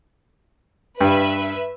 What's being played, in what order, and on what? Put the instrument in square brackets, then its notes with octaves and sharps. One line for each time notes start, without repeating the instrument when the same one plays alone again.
[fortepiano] G2 [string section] B4 E5